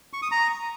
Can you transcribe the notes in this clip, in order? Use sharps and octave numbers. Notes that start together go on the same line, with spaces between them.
C#6
D#6
A#5